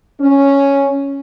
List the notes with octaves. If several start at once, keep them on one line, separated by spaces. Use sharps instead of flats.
C#4